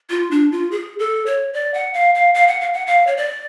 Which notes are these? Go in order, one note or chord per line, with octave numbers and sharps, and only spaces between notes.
F4
D4
F4
G#4
A4
C#5
D5
F#5
F5
F5
F5
F#5
F5
F#5
F5
C#5
D5